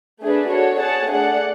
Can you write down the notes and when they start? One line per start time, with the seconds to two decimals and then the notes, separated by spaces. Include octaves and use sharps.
0.22 A3 D4 G#4 B4
0.51 D4 F#4 A4 C#5
0.80 G#4 C#5 F#5 A5
1.09 A3 D4 G#4 D5 F#5